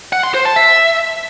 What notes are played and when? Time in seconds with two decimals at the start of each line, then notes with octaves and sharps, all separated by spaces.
0.13 F#5
0.23 C6
0.34 C5
0.45 A5
0.56 E5